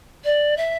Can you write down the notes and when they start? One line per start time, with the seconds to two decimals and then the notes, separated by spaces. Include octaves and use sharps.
0.24 D5
0.57 E5